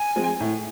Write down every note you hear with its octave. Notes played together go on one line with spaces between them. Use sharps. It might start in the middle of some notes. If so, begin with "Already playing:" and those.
Already playing: G#5
F3 G#3 C4
A2